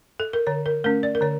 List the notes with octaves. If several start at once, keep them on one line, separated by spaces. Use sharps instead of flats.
A4
A#4
D3 C#5
A#4
A3 C#4 A#4
D5
A#4
D3 C#5